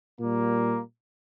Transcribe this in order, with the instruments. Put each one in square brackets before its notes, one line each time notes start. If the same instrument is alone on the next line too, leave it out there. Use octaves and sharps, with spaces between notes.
[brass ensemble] A#2 G3 A#3